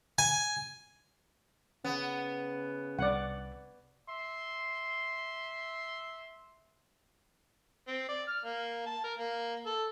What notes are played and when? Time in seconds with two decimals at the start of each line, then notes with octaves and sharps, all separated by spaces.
0.19 G#5
1.84 C#3 B3
2.99 C2 D5 F#5
4.10 E5 C6
7.88 C4
8.09 D5
8.28 F6
8.45 A#3
8.86 A5
9.04 A#4
9.18 A#3
9.66 A4